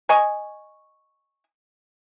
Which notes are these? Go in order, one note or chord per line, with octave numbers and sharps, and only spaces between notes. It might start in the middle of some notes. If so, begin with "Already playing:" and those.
D#5 G#5 C#6